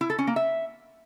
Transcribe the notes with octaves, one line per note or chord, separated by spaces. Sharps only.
E4
A4
C#4
A#3
E5